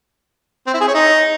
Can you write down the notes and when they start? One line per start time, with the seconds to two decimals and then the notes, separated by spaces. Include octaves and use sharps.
0.67 C4
0.74 E4
0.81 G#4
0.88 C#5
0.95 D#4